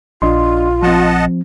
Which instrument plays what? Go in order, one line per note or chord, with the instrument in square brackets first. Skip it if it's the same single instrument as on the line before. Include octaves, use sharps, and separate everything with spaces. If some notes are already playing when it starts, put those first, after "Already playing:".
[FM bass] A#1 [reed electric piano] D4 D#5 C6 [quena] F4
[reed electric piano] F3 C4 [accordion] D#5 F#5 A5